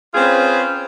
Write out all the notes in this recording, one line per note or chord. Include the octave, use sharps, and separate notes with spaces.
C4 C#4 F4 G#4 B4 C5